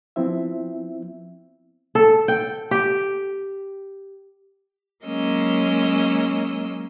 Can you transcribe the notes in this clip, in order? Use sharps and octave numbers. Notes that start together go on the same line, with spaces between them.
F3 B3 C4 E4 E5
A4
G5
G4
F#3 G#3 A#3 C#4 D#5 E6